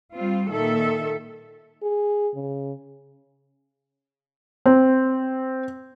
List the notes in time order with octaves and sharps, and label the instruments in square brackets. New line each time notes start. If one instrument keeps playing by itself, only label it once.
[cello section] G3 C4 F4
A#2 D#3 A4 E5
[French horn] G#4
C#3
[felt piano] C4